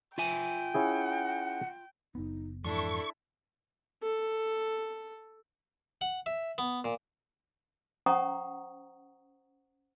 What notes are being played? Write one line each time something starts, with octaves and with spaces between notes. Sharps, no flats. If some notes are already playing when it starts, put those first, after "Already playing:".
F4 E5 G5 G#5
C#4 E4 G#4 F#5
F#1 B3 D#4
F2 G#2 E3 D4 E4 A4 C#6
A4
F#5
E5
B3
A#2
C#4 C5 F#5 A#5 C#6 D#6